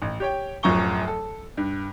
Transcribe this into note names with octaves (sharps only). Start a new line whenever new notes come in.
A1
G4 C#5 G5
D1 F#2 F3 A#5 C#6 G7
A4
G2